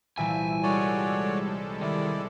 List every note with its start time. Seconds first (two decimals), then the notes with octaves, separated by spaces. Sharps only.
0.18 C2 A#2 E3 E5 G5 G#5
0.63 G3 G#3 F#4 A4 C#5 D5
1.81 D#3 E4 D5